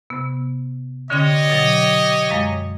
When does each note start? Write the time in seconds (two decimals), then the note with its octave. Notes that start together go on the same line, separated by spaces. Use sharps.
0.10 C3 B3
1.10 D3 C#4 G4 C#5 D#5 C6
1.50 B2 F#3
2.30 F#2 G#3 F5